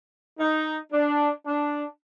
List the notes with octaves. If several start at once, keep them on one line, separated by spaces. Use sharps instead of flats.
D#4
D4
D4